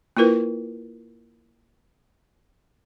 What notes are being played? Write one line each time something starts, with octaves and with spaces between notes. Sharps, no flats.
A#3 E4 F4 A#4 B4